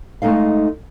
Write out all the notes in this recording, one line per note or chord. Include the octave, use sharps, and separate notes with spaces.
G#3 A3 D#4 A4 F5